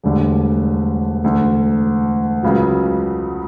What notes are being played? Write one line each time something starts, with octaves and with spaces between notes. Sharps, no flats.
E1 D2 D3 G3
E1 D2 D3
C#2 C#3 F#3